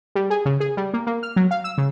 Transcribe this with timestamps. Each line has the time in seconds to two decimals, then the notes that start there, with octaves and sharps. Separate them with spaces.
0.15 G3
0.30 G#4
0.45 C#3
0.60 G#4
0.77 G3
0.93 A#3
1.07 A#3
1.23 F6
1.36 F#3
1.51 F5
1.64 E6
1.78 C#3